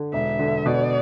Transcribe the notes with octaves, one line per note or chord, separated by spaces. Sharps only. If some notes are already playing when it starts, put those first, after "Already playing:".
Already playing: D3
E1 E5
D3
B2 D5